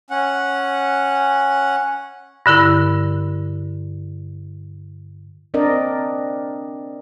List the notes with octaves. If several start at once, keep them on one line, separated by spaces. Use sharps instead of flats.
C#4 F#5
G2 D3 E4 A#4
C4 D4 A#4 D5 D#5